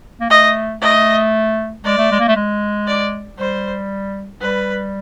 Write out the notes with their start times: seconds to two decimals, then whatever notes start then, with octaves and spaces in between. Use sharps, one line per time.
0.21 A#3
0.30 A3 D#5
0.82 A3 D#5
1.84 G#3 D5
1.98 A3
2.11 G#3
2.20 A#3
2.28 A3
2.36 G#3
2.87 D5
3.38 G3 C5
4.41 G3 B4